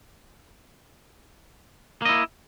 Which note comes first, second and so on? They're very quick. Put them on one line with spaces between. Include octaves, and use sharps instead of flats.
A#3 D#5 E4